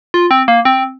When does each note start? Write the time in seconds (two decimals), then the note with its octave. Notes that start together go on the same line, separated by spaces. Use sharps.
0.14 F4
0.31 C4
0.48 A#3
0.65 C4